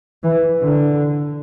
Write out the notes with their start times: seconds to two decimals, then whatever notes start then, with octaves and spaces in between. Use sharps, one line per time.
0.24 E3
0.63 D3